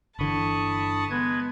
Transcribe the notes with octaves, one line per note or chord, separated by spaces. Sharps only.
G1 D3 E3 A5 B5 C#6 D#6
G#3 B3 B4 G#6